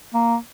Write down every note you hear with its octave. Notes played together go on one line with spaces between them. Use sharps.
A#3